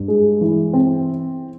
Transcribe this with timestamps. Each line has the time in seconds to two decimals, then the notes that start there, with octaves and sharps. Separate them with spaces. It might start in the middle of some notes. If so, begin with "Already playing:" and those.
Already playing: G2
0.08 G#3
0.41 E3
0.73 C4